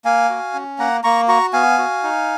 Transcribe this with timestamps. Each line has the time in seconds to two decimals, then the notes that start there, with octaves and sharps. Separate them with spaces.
0.05 A#3 F5 G#5
0.29 F#4
0.54 C#4
0.79 A#3 F#5 A#5
1.03 A#3 A#5 C#6
1.28 F#4 A#5 C#6
1.53 B3 F5 G#5
1.78 F#4
2.03 D#4